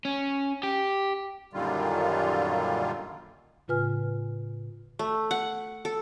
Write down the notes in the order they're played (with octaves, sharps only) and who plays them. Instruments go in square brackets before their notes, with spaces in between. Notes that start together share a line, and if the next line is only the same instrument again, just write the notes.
[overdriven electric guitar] C#4
G4
[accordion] F#2 A#2 D3 D#3 G3 F4
[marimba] A2 C#3 F4 B4 G#5 F6
[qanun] A3
F#5
A4